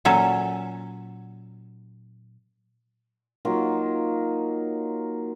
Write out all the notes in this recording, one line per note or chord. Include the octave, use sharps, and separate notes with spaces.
A#2 F#3 C#4 A4
F#3 A#3 D#4 F4